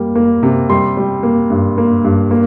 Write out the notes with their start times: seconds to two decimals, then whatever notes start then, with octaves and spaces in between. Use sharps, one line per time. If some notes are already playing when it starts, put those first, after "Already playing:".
Already playing: G3 A#3
0.15 A#3
0.43 C3
0.69 G3 C6
0.97 G3
1.23 A#3
1.50 G2
1.78 A#3
2.04 G2
2.31 A#3